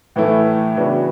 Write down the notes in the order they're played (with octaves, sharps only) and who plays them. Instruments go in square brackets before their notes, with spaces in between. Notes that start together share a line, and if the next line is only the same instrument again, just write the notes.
[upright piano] A2 E3 A3 E4 A4
C#3 E3 B3 D4 F#4